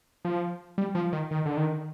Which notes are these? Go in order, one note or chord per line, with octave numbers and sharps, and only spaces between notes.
F3
G3
F3
D#3
D#3
D3
D#3